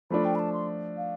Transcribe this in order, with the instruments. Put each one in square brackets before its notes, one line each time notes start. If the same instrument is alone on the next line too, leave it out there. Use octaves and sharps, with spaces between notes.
[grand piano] F3 A3 D4 [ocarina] B5
[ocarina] G5
B5
A5
C6
F5